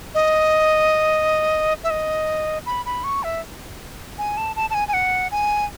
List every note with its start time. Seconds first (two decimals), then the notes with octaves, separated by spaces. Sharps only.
0.15 D#5
1.84 E5
1.90 D#5
2.66 B5
2.86 B5
3.04 C#6
3.23 E5
4.18 G#5
4.37 A5
4.56 A5
4.70 A5
4.74 G#5
4.88 G#5
4.93 F#5
5.31 G#5